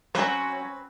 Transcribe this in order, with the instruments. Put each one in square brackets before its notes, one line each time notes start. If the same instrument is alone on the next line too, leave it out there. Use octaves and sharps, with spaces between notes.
[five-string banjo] F3 F#3 [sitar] C4 F#4 B4 [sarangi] C#4